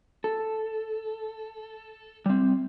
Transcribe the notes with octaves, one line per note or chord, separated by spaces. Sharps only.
A4
G3 C4